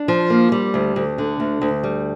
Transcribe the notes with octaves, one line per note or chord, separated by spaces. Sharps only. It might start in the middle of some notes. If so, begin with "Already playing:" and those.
Already playing: D4
F3
A#3
G3
D2
D2
D3
D2
D2
G3